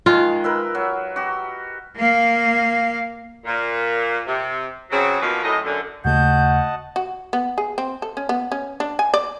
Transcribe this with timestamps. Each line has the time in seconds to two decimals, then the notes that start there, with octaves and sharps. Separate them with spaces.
0.06 D#3 G#3 F4
0.44 A#4 B4 E5
0.75 F#3
1.16 F#4 G4
1.97 A#3 F5
3.45 A#2
4.26 C3
4.90 C#3 F#3 C4
5.20 B2 E3 F3 A#3 F#4 B4
5.43 F#2 A2 D#5
5.64 F#2 D3
6.05 D#2 C#3 A3 F#4 D#5 F#5 A5 G6
6.96 F#4
7.33 B3
7.58 G#4
7.78 C4
8.02 A4
8.17 C#4
8.29 B3
8.52 C#4
8.80 D4
8.99 G#5
9.14 D5